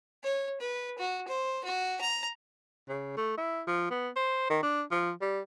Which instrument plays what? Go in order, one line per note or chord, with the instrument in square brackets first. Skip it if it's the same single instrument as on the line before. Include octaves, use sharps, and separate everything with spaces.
[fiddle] C#5
B4
F#4
C5
F#4
A#5
[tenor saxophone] C#3
A3
E4
F3
B3
C5
D#3
D4
F3
G3